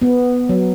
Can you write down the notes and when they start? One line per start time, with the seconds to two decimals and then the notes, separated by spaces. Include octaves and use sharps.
0.02 B3
0.49 F#3